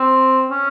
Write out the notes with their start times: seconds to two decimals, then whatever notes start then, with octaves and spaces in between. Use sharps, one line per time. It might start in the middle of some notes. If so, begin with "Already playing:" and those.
Already playing: C4
0.50 C#4